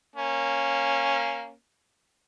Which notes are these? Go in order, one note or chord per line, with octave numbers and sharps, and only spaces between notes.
A#3 C#4